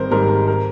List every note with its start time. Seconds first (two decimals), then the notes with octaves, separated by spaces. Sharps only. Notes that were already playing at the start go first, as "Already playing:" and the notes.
Already playing: G#1 G#2 G3 A#4 C5
0.11 G#2 G3 A#4
0.29 A#4
0.48 A#4